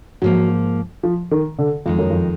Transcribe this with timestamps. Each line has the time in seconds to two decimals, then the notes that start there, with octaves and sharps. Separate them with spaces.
0.22 G#2 F3 F#3 A#3
1.03 F3
1.31 D#3
1.59 D3
1.86 F2 D#3 G#3 D#4
1.99 F#2
2.10 F2